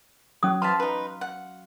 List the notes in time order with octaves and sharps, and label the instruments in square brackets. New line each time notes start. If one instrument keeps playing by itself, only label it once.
[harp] F#3 [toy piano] C#4 D#6
[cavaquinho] B4 C5 A5 [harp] F5 F6 B6 [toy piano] C6
[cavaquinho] D#4 B4
F#5